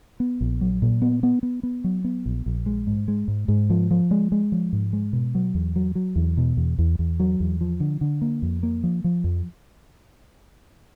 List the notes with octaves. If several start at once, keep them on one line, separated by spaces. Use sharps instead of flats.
B3
A#1
F#3
A#2
B3
B3
B3
B3
F#3
B3
A#1
A#1
G#3
G#2
G#3
G#2
G#2
F3
F3
G#3
G#3
F3
G#2
G#3
B2
F#3
E2
F#3
F#3
E2
B2
E2
E2
E2
F#3
E2
F3
D3
D3
A#3
F2
A#3
F3
F3
F2